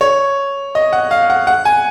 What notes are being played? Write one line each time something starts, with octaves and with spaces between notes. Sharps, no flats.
C#5
D#5
F#5
F5
F#5
F#5
G#5